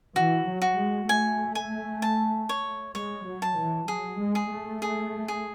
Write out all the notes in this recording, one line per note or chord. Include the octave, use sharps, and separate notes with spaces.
E3 F#4
F#3
F#4
G#3
A3 G#5
G#5
A5
C#5
G#3 C#5
F#3
A5
E3
F#3 G#4
G#3
G#4
A3
G#4
G#4